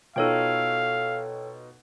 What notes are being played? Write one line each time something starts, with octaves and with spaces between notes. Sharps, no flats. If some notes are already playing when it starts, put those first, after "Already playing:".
B2 D#4 F4 A4 C#5 F5 G5